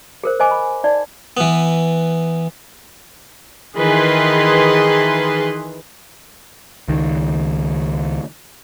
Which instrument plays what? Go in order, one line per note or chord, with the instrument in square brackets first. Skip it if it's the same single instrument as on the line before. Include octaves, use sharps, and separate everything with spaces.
[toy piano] G#4 A#4 C5
C5 D#5 G#5 D6
B5
D#4 D5
[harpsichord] E3 B3
[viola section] D#3 E3 G#4 B4 C6
[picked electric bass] C#2 D#3